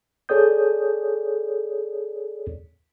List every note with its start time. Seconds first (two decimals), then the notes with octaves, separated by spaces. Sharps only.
0.29 G#4 A4 C#5 D5 D#6 G6